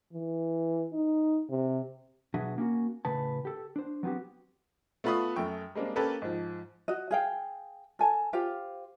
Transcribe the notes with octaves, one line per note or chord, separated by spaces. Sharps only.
E3
D#4
C3
B2 F#3 D4 F#4 G#4 E5
A#3 C#4 F#4
A2 C#3 B4 A5
G4 A4
D4 C5
F#3 B3 C4 F#4 G4
A3 B3 F4 B5 C#6 D#6
F#2 A3 G5 C#6
G3 G#3 A#3 C4 D4
A#3 C#4 G4 A4 B4
G#2 F3
F#4 D#5
G#4 F5 G5
A4 G#5 A5
F4 G4 C5 F5